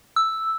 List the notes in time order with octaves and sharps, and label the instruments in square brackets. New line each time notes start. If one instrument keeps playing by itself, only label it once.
[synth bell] E6